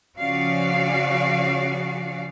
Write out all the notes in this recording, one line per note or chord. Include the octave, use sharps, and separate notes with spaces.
C#3 F3 C#4 F#4 D5 F5